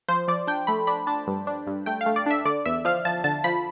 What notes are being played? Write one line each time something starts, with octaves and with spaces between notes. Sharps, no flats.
F3 C5
F3 D5
D4 G5
A3 B5
D4 B5
D4 A5
G2
D4
G2
A3 G5
F5
A3
D5
D4 E5
D3 D5
E2 E5
F3 F5
F3 A5
D3 A5
F3 B5